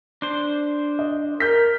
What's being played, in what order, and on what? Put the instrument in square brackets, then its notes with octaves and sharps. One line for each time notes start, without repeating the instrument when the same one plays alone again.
[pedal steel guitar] D4 C5
[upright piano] D#5
[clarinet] A#4 [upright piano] G6 B6